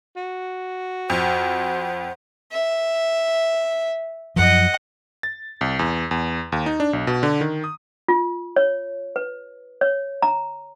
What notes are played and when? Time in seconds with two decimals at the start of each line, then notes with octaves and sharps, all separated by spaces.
0.16 F#4
1.10 F2 C5 F#5
2.52 E5
4.36 F#2 F3 D#5 F#5
5.23 A6
5.61 C2
5.79 E2
6.11 E2
6.52 D#2
6.66 D#4
6.80 D4
6.93 B1
7.07 B2
7.23 D3
7.41 D#3
7.64 D#6
8.08 F4
8.56 C#5
9.16 B4
9.81 C#5
10.22 A#5